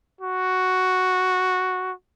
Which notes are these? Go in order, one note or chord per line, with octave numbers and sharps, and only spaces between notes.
F#4